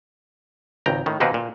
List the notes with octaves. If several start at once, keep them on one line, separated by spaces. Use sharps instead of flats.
G#1 C#2 G5 A#5
A2 D#3
D#2 B2 A#3 C4 D#4 B4
A#2